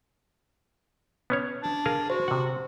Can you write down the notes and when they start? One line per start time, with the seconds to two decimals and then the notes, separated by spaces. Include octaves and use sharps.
1.30 B3 C#4 C#5
1.63 D4
1.86 G#4 A#4 F5
2.10 F#4 C5
2.28 C3 F#5